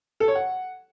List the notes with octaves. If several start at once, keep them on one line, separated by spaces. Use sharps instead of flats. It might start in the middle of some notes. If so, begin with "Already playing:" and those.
A4
C#5
F#5